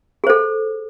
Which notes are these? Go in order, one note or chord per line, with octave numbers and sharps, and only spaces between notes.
G#4 A4 C5